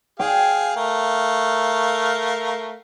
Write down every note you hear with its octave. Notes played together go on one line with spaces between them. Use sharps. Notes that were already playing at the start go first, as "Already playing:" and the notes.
G#4 F5 G5
A3 A#4 F5